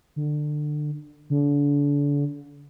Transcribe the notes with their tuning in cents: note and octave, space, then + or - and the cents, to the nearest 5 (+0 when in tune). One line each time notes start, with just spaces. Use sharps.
D3 +25
D3 -35